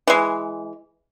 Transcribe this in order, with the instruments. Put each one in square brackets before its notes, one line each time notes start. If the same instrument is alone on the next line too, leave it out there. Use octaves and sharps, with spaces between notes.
[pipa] E3 G#3